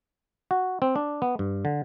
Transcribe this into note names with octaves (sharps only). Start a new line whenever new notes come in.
F#4
C4
D4
B3
G2
D3